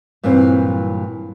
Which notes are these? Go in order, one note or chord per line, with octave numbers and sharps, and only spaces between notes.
G2 A#2 E3 F#3 C4